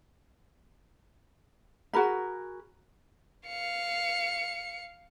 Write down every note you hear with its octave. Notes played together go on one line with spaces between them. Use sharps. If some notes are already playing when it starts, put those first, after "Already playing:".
F#4 G#4 A#4 B5
F5 C#7